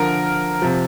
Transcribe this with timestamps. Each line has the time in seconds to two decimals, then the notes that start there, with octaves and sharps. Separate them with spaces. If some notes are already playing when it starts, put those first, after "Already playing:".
Already playing: D3 F3 A#4
0.62 C3 F3